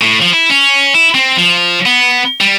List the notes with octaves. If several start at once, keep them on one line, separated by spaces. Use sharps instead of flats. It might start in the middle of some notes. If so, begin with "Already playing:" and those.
A2
F3
E4
C#4
E4
C4
F3
B3
G3